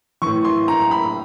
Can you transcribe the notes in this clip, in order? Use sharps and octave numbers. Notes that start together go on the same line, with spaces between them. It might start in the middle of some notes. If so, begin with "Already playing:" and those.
A2 E3 C#6
C6
A#5
B5